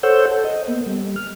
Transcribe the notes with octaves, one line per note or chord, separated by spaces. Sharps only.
A4 C5 C#5 F#5 E6 G6
A4
D#5
A#3 B3
G3
F6